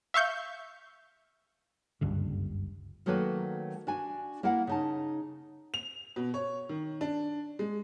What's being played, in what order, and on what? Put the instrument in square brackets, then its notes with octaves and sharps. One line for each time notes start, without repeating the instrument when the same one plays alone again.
[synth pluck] E5 F5 C#6 G6
[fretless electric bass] F#1 C#2 G2 D3
[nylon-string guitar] D#3 F#3 A3 A#3 F#4 B4
D4 F#4 G#5
A#3 E4 A#4 F5 F#5
C#3 D#4 A5
[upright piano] F7
B2
C#5
D#3
D4
G#3